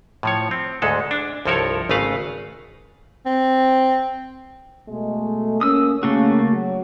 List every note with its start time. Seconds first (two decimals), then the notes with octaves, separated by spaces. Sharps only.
0.23 A2 F3 C#5
0.51 C4
0.82 D2 G#2 G#3 A4
1.11 D4
1.45 C2 G2 F3 A4 A#4 C#5
1.89 G#1 C#3 A3 B4 F5 A#5
3.26 C4
4.89 B2 G#3 A3
5.61 A#3 C#4 D#6 E6
6.03 C#3 A3 A#3 F#4
6.53 F#3